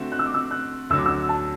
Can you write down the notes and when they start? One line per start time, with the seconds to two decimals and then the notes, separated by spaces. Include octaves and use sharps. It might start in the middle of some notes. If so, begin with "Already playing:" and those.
Already playing: D3 A3 C4 F#4
0.12 F#6
0.19 E6
0.26 D6
0.34 E6
0.51 F#6
0.90 D2 D3 F#3 E6
0.98 D6
1.06 E6
1.29 A5